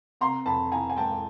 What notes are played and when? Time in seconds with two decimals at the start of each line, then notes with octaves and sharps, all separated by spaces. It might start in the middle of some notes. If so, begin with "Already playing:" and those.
0.21 C3 A#5 C6
0.46 F2 A5 B5
0.72 E3 G#5 A#5
0.90 G#5
0.96 G#3 G5 A5